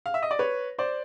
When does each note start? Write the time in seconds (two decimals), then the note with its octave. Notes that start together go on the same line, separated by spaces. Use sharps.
0.06 F5
0.14 E5
0.23 D#5
0.31 D5
0.39 B4 C#5
0.79 C5 D5